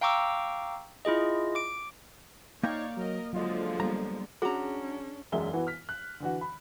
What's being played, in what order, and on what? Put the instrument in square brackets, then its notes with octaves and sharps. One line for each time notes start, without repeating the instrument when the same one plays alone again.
[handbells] F5 G5 A#5 C#6 D6 E6
E4 F4 G#4 D#5
D6 D7
[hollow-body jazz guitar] A#3 G5 A#5 [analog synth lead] D#4 [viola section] C#5 D5 [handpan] F5
[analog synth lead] F#3 [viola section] A#4 D#5
[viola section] D3 F3 G#3 [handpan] F#3 D#5 [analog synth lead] F4
[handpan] G3 A#3 B3 [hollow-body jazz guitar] A#5
[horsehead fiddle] C#4 D4 [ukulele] F#4 A#5 [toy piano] G#4
[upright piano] E1 B1 F#2 G#3 E5 G7
E3 B3 E4 F#4
F6 B6
F#6
D3 E3 F#4
B5